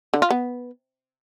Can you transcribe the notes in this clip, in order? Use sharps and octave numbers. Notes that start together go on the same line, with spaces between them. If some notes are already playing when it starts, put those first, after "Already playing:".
D3
F4
B3